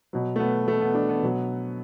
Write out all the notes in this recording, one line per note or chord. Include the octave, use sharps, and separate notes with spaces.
B2 F#3
A3
B3
A3
B3
D4
B3
B2 F#3